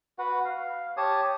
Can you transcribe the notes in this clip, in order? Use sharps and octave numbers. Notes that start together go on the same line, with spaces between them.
F#4 B4 F#5
F5
G4 C#5 A5 D#6